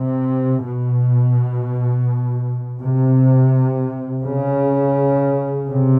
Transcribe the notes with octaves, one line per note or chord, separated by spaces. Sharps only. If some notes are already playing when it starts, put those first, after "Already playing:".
Already playing: C3
B2
C3
C#3
C3